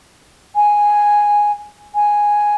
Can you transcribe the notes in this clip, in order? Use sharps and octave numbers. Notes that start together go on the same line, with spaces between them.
G#5
G#5